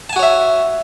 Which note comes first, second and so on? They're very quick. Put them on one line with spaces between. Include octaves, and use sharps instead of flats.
A5 G#5 F#4 C#5 E5